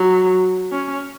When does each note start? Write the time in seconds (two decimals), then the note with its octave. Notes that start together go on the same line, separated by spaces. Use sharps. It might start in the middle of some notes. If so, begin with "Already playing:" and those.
Already playing: F#3
0.72 C#4